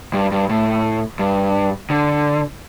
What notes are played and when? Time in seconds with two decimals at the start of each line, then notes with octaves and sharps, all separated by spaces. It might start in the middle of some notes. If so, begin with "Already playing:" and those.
0.13 G2
0.32 G2
0.49 A2
1.19 G2
1.90 D3